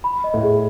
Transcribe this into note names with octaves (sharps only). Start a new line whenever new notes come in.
B5
D#5
A2
G#4